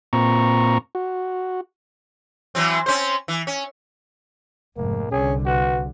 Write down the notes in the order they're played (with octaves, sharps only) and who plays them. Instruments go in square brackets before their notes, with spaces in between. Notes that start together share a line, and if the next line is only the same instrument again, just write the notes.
[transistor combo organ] A#2 C4 A#5 C#6
F#4
[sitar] E3 F#3 C4
C4 C#4 C5
E3
C#4
[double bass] F1 G#2 [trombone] A#3
[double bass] C2 D3 [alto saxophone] C#4 [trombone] G#4
[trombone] F#4 [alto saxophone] B4